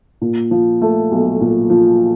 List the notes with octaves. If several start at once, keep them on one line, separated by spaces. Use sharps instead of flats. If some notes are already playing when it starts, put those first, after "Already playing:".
A#2
F3
A3
B1
A#2
F3